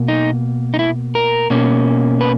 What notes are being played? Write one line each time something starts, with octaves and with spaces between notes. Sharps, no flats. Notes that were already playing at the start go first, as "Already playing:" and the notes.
Already playing: B2 A#3
D#4
D#4
E4
A#4
B2 A#3 C#4
B4